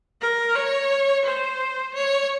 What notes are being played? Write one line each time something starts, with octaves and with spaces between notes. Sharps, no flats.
A#4
C#5
C5
C#5